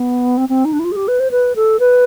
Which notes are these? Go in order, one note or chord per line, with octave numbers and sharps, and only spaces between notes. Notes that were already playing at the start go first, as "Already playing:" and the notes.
Already playing: B3
C4
C4
D#4
D4
E4
F4
G#4
G4
B4
C5
B4
A4
B4